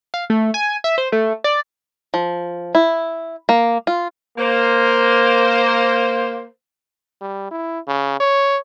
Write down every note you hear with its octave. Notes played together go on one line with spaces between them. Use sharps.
F5
A3
G#5
E5
C5
A3
D5
F3
E4
A#3
F4
A#3 C5
G3
E4
C#3
C#5